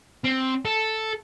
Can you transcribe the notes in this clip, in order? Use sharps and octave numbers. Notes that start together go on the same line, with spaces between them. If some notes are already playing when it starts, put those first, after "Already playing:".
C4
A4